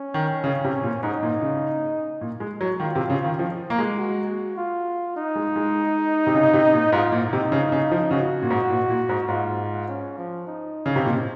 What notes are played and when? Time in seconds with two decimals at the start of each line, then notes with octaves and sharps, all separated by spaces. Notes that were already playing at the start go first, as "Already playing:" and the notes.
Already playing: C#4
0.14 D#3
0.44 C#3
0.64 C3
0.83 A#2
1.03 G#2 D#4
1.23 A#2
1.42 C#3
2.21 A#2
2.40 G#3
2.61 F#3
2.80 D#3 F4
2.95 C3
3.10 C#3
3.24 D#3
3.39 F3
3.70 A#3
3.78 G#3
3.98 F#4
4.57 F4
5.16 D#4
5.35 G#3
5.56 G#3
6.27 C3
6.34 C#3
6.54 C3
6.73 A#2
6.92 G#2 F4
7.12 A#2
7.22 D#4
7.33 C3
7.52 C#3
7.72 C#3
7.91 F3
8.11 C#3 F#4
8.42 A#2
8.50 G#2
8.70 A#2
8.90 A#2
9.09 G#2
9.28 G#2 F4
9.88 C#4
10.18 F3
10.47 D#4
10.86 C#3
10.96 C3
11.05 A#2